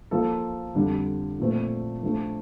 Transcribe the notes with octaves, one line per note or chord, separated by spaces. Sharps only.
F3 A#3 F4 A4
F2 D3 G3
A#2 F3 A3 C4
F3 A3 D4